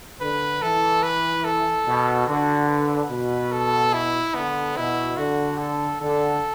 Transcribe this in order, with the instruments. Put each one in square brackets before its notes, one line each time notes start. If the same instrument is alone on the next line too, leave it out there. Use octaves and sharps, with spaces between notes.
[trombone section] D3 [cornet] B4
[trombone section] E3 [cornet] A4
[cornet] B4
A4
[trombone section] B2
[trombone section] D3 [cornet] F#4
[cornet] B4
[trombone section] B2
[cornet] A4
E4
[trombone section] D3 [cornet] B3
[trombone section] B2 [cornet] E4
[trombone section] D3 [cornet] F#4
[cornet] A4
[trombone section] D3 [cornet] A4